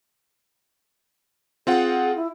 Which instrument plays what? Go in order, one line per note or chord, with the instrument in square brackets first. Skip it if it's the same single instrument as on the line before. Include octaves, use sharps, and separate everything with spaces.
[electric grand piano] C4 F4 F#5 [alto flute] G#4
[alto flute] E4